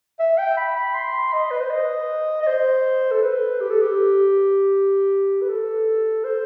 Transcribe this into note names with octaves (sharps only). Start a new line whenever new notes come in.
E5
G5
B5
B5
C6
D#5
B4
C5
D#5
D#5
C5
A4
B4
G4
A4
G4
B4
A4
C5